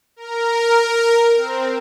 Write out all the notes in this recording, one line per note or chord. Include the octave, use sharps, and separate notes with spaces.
A#4
C4